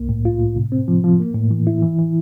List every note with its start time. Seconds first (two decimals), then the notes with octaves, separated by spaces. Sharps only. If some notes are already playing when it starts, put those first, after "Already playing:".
Already playing: C2 A#3
0.09 A2
0.25 F4
0.40 A2
0.56 C3
0.72 C4
0.88 F3
1.04 F3
1.20 A#3
1.35 A2
1.51 E3
1.67 E4
1.82 E3
1.99 E3